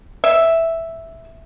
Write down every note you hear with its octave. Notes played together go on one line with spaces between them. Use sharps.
E5